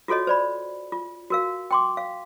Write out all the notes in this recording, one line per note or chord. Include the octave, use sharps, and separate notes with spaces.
F4 F#4 A4 C#5 D#5
C5 D5 B5
F4
F#4 A#4 F5
G5 C6 D6
F5